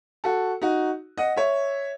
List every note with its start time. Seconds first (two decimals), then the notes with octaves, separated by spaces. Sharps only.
0.24 F#4 A4
0.62 D#4 F#4
1.18 D#5 F#5
1.37 C#5 E5